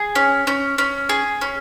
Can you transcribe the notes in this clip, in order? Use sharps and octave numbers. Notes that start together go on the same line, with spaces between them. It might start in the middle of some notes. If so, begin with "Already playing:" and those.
Already playing: G#4
C#4
C#4
C#4
G#4
C#4